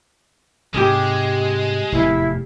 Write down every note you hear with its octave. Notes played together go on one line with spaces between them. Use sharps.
G#2 C3 G#3 G4 G#4
F1 E2 A2 E4